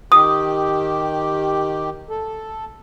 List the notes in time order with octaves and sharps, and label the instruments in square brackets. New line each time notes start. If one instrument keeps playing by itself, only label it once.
[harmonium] D#3 G4 [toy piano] D#6
[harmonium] A4